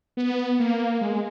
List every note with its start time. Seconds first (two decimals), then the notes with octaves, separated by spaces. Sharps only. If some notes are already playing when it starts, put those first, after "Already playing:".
0.17 B3
0.60 A#3
1.01 G#3